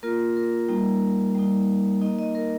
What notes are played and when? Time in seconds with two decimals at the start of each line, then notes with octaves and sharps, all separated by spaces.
0.03 A#3 F4 A#4
0.37 A#4
0.69 G3 A#3 D#4
1.35 G3 A#3 D#4
2.01 A#3 D#4 D#5
2.19 D#5
2.35 A#4